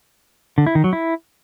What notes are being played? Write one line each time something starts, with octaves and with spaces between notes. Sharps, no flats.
D3
E4
D#3
F#3
E4